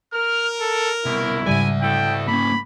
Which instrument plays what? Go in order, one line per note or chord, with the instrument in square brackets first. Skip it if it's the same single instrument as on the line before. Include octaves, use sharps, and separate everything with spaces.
[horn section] A#4 [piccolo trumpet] F6
[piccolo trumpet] A4
[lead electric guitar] C2 B2 [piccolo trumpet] E4
[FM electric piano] G#2 C#3 G3 [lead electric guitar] D5 E5 [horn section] G#5
[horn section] B2 E4 A4 [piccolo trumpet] G5
[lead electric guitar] A#3 C#4 [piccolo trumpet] B5